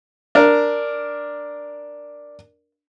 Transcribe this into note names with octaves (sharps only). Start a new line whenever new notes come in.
D4 A#4